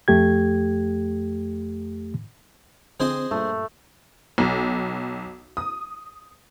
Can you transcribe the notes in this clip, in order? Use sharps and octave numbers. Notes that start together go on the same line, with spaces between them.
F2 A3 G4 G#6
D3 F3 C4 G#4 C5 D#5
G2 A#2 A3
B1
D#6